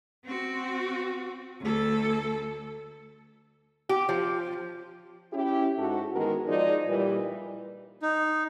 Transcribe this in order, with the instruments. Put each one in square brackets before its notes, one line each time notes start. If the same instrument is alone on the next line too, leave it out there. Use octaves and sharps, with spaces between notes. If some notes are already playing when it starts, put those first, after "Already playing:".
[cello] C4 F#4
D2 A4
[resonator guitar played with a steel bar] G4
F3
[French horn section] C#4 E4 G4
G#2 F#4 A4
D#3 E3 G#3 B3 F#4 A#4
F3 G#3 D#4 D5
A#2 E3 G3
[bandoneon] D#4